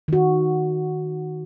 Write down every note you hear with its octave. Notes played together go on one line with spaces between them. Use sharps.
D#3 F#4